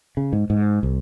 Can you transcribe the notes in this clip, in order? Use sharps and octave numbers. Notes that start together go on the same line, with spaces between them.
C#3
G#2
G#2
C2